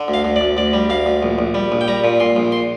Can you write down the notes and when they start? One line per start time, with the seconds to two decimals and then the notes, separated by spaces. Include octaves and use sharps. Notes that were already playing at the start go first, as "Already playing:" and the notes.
Already playing: D3
0.08 D2
0.14 F5
0.24 D2
0.36 D5
0.41 D2
0.57 D2 D5
0.73 G3
0.90 D2 F5
1.06 D2
1.23 A#1
1.39 A#1
1.54 G3
1.72 A#1
1.81 G5
1.88 G3 A#5
2.04 A#2
2.20 A#2 C6
2.36 A#1
2.52 C6